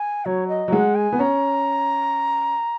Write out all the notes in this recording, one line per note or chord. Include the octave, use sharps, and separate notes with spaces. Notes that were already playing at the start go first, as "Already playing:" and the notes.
Already playing: G#5
F#3 C#5
D#5
F#3
G#3 F#5
G#5
B3
C#4 A#5